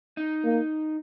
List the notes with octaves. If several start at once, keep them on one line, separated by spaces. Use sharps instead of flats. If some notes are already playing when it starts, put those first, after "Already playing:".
D#4
A#3